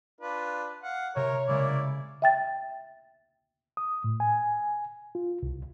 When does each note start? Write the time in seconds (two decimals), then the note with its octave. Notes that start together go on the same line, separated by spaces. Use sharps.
0.21 D4 F4 B4
0.83 F5 F#5
1.16 C3 A#4 C#5
1.48 C#3 G#3 A#3 E4 D5
2.22 E5 G5 A6
3.77 D#6
4.04 A2
4.20 G#5
5.15 F4
5.43 C2